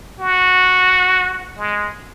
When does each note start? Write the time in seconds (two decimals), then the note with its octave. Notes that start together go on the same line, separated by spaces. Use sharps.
0.20 F#4
1.58 G#3